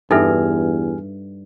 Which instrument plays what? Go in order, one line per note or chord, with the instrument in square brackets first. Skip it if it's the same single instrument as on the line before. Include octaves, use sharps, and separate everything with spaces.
[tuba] E2 [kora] G2 [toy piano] D#4 A4 E5 [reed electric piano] G4 G#5 F6